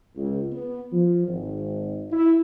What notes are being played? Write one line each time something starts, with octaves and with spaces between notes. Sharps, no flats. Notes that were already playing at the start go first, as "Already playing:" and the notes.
C#2
B3
F3
G#1
E4